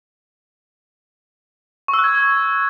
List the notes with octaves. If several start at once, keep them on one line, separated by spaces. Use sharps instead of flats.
C#6
E6
F#6
G#6